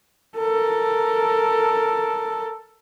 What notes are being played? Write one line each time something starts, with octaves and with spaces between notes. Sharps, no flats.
A4 A#4